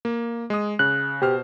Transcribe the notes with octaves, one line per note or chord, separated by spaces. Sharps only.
A#3
G#3 D#6
C#3 F#6
B2 G4 C5 F6